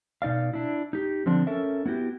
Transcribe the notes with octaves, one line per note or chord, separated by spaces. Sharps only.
B2 D#4 D5 F5
D4 E4
D#4 G4
D3 F3 C4 D4
C#4 A4 A#4 E5
B3 E4 F#4 G4